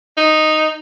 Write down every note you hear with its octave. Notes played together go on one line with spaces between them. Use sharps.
D#4